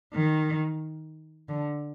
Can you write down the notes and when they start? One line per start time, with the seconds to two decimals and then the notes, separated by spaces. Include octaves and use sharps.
0.14 D#3
1.49 D3